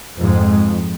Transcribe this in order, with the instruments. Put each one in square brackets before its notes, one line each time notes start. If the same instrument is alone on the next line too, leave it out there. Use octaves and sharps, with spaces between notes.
[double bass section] F2 G#2 G#3